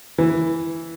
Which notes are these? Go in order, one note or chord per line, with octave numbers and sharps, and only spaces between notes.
E3